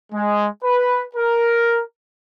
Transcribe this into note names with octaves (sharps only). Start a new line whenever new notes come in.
G#3
B4
A#4